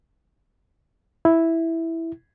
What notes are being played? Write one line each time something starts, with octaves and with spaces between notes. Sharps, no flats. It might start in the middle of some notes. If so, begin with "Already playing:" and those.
E4